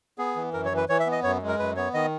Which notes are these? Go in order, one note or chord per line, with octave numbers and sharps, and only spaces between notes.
B3 G#4
E3
F#2 A#4
C#5
E3
B4
E3 C#5
E5
B3
D#5
F#2 C#5
G#3
A#4
F#2 B4
B3 C#5
D#3 D#5